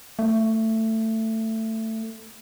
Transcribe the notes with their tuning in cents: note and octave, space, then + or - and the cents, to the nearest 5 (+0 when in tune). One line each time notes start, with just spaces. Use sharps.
A3 +15